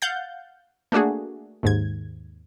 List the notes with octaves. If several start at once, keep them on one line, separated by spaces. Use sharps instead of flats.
F5 F#5 G6 A6
A3 A#3 D4 F#4 G#4
D#2 G#2 G#6